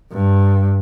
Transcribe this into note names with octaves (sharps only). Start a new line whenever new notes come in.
G2